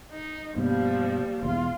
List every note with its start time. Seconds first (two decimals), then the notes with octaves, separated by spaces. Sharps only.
0.12 D#4
0.56 G2 B2 F3 G3 A#3
1.43 E1 E2 F4